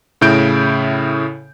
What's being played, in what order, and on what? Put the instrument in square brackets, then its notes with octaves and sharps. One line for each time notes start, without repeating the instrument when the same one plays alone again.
[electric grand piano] A2 C#3 E4 G6 D7